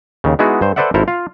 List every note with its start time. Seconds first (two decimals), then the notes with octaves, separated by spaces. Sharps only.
0.24 D#2 C#3
0.39 G#3 B3 D#4 E4 F#4 G#4
0.61 G2 C5
0.76 A4 B4 C5 D5 E5 F#5
0.94 G#1 E4 A4 A#4 C5 A#5
1.08 F4 F5